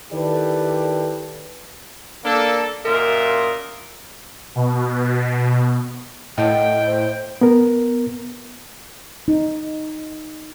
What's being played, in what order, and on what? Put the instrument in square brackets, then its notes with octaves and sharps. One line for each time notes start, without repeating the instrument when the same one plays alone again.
[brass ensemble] D#3 E4 G4 A4 B4 D5
[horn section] A#3 D4 A4
F#2 A#2 F4 A#4 D#5 E5
[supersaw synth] B2
[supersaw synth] A2 [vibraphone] D#5 [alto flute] F#5 [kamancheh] G5
[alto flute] C5
[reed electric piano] B3 A#4
[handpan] D#4